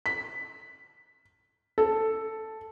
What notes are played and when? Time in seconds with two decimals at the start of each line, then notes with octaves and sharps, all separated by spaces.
0.06 B6
1.78 A4